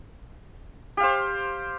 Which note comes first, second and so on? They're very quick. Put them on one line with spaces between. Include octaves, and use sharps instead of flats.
G4 F5 C5